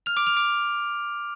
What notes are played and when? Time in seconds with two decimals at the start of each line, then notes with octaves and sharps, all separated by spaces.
0.06 F6 F7
0.17 D6 D7
0.27 F6 F7
0.37 D6 D7